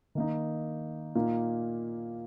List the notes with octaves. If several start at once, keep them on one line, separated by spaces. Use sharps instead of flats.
D#3 A#3 D#4
A#2 A#3 D#4